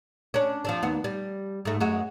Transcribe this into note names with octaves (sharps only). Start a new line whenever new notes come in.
C#4 D4
F3 C4 D4
D#2 B3
G3
G#2 A3
F#2 G#3 F#4